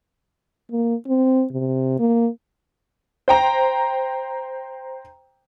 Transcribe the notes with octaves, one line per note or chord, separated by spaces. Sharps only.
A#3
C4
C3
A#3
C5 G5 A#5